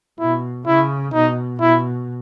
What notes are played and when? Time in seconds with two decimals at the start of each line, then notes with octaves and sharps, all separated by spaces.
0.19 B2 E4
0.67 C#3 E4
1.13 B2 D#4
1.60 B2 E4